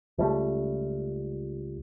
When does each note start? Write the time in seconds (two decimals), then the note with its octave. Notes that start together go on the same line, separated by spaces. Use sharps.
0.18 C#2 G3 A3